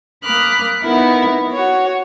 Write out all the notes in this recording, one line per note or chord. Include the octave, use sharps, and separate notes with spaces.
A#3 B5 D6 D#6 F6 F#6
B3 D#4 E4 A#4
F#4 C#5